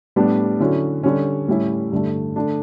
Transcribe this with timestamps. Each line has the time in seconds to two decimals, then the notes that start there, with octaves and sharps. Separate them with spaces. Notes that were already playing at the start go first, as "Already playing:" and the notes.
0.16 A2 G3 B3 D4
0.60 D3 F#3 C#4 E4
1.03 D3 G3 C#4
1.48 A2 G3 C#4 E4
1.92 G2 D3 A3
2.36 D3 A3 D4